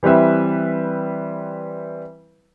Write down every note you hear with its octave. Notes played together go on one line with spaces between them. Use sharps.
E3 G3 C4 B4 E5